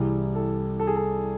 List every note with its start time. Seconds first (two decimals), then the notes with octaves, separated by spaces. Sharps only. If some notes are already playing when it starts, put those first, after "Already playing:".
Already playing: C2 C3 E3 G3 G#4
0.35 A4
0.80 A4
0.87 G#4
0.96 A4